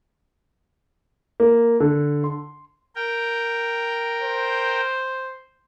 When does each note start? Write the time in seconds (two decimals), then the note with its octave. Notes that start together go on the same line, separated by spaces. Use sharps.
1.40 A#3
1.80 D3
2.24 C6
2.95 A#4 G5
4.21 C5